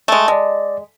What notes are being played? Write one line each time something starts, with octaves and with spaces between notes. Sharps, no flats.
G#3 A3
G#3 D5 D#5